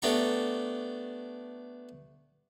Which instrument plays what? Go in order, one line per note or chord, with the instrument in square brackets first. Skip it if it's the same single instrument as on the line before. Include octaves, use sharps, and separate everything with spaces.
[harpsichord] A3 B3 D4 G4 A#5 C#6